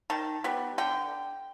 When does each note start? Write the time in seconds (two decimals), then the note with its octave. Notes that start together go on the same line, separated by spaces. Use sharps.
0.10 D#3 A5
0.44 G3 B3
0.78 D3 G5